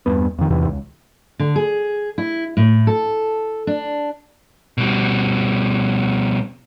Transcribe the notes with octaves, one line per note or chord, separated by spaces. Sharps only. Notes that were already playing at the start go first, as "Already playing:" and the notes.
E2 G2 B3
F2 D#3
E2 G#2 C3 E3
C#2
D3
G#4
E4
A2
A4
D4
B2 G3